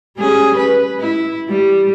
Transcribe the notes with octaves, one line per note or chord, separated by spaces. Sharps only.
G3 C#4 G#4
B4
E4
G3